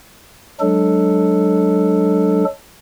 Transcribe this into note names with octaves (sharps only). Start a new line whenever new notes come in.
F#3 G#3 D4 A4